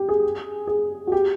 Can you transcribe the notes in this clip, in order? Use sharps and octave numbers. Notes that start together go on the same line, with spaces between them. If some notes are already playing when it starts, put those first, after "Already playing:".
Already playing: G4
G#4
G#4
F#4
G4